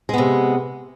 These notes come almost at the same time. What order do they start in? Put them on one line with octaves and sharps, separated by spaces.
G#3 B3 C3